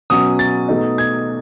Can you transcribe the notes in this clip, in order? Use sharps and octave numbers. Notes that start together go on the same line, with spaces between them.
B2 F#3 C#4 D#6
A6
B2 A3 D#4
G#6